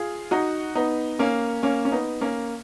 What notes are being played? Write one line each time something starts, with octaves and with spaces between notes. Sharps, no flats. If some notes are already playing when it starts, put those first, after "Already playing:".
Already playing: F4 G#4
D#4 F#4
B3 D#4
A#3 C#4
A#3 C#4
C#4
B3 D#4
A#3 C#4